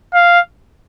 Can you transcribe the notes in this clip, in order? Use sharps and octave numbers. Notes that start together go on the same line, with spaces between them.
F5